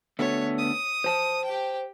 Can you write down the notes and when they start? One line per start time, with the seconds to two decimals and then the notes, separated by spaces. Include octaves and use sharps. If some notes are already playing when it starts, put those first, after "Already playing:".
0.19 D3 A3 B3 C#5
0.59 D#6
1.04 C5 A5
1.45 G4 G5